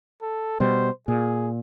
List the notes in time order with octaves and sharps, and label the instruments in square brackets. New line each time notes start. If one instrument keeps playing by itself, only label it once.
[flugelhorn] A4
[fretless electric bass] B2 G3 [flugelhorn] C5
[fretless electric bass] A#2 [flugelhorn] G#4